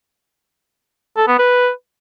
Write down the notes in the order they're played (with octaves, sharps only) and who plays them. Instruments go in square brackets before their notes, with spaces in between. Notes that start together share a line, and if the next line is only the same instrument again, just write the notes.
[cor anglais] A4
B3
B4